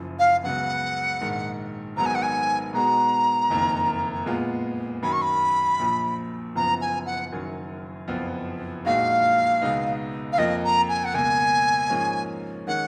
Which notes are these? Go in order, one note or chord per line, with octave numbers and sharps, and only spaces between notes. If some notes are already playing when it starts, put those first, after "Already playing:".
Already playing: F#1 F#2 F3
F5
C#2 C#3 F#3 B3 F#5
A#1 G#2 D#3
G#1 G#2 F#3 B3 A#5
G#5
F#5
G#5
B2 G#3 B3 F#4 A#5
F#1 F2 D#3 A#3
A#2 G#3 B3 F4
F#2 D#3 F#3 B5
C#6
B5
A#1 A#2 F3
F#1 F#2 F3 B3 A#5
G#5
F#5
F#1 F#2 D#3 F#3
F#1 F2 F3 B3 F4
A#1 A#2 G#3 D#4 F#4 F5
C#2 B2 G#3 B3 D#4
F5
F2 F3 A#3 F4 D#5
A#5
G#5
F#5
C#2 B2 A#3 G#5
G#2 F3 A#3 C#4
D#3 G#3 C#4 F#5